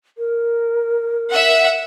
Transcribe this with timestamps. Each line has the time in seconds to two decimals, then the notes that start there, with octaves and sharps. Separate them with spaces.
0.18 A#4
1.30 E5 F#5